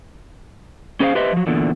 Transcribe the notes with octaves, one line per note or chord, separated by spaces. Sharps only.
C#4 G#4 C5 D#5 F5
G4 B4 C5 D#5 E5
F3 F#3
E2 A#2 D3